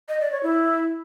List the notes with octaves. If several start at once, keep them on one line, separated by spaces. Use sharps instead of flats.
D#5
D5
C#5
E4